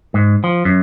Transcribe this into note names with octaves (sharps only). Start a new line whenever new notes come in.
G#2
F3
F#2